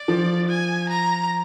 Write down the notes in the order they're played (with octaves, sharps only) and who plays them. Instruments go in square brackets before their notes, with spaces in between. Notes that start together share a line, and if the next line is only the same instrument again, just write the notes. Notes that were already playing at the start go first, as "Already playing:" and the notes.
Already playing: [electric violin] D5
[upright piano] F3
[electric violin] G#5
A#5